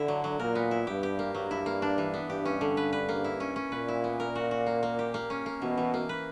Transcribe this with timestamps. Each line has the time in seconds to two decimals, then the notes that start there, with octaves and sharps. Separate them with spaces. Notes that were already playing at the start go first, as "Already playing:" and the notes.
Already playing: D3 E4
0.08 F#3
0.24 F#3
0.39 A#2 A#4
0.55 B3
0.71 E4
0.87 G2 G4
1.03 G4
1.19 A#3
1.34 G2 F#3
1.51 E4
1.66 A#3
1.82 D4
1.98 E3
2.14 B3
2.30 G2 G4
2.45 C#4
2.61 D3
2.77 B4
2.93 B4
3.09 A#3
3.24 E4
3.40 C#4
3.56 C#4
3.72 A#2 B4
3.88 E4
4.04 B3
4.20 A#4
4.35 F#4
4.51 F#4
4.66 A#3
4.83 A#3
4.99 G4
5.14 A#3
5.30 C#4
5.46 A#3
5.62 B2 E3
5.77 E3
5.94 A#3
6.09 B4